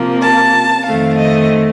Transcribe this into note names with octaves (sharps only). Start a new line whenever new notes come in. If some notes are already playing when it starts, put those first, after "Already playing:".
Already playing: C3 F3 A#3
A5
F2 D#3 A3 C4 F5
D#5